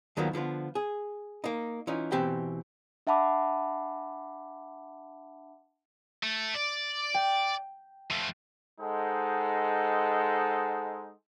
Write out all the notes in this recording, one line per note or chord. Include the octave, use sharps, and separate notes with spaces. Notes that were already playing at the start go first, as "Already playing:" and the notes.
D#2 D#3 F3 F#3 A#3 B3
D3 F3 B3 F4
G#4
A#3 D#4
E3 C#4 D#4 F4
B2 E3 C4 G4 G5
D4 E5 F#5 A5 B5 D6
A3
D5
G5
F3 A3
G#3 D#4 A4 C5 F#5